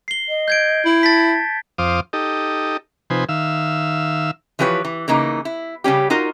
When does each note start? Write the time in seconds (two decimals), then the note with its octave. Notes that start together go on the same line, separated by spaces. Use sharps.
0.08 C7 G7
0.29 D#5
0.48 G6 G#6 D7
0.85 E4
1.03 A5 A6 B6
1.78 F2 C5 F5 D6 D#6
2.13 D#4 G4 A4 D#5
3.10 C3 F3 D#4 B4 C5 G#5
3.29 D#3 E5 F5 E6
4.59 E3 F3 G4 B4 C#5
4.85 E3
5.08 C#3 E3 A#3 D#4
5.45 E4
5.84 C#3 G3 C#4 G4
6.10 D#4 F4 F#4 A#4